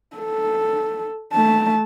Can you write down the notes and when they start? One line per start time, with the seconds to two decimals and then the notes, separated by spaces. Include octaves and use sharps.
0.17 A4
1.33 A3 A5